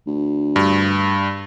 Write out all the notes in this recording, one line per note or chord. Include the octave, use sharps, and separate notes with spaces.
D2
G2